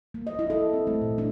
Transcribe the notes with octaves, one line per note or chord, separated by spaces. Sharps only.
A#3
D#5
E4
A4
C4
A3
A#2
D4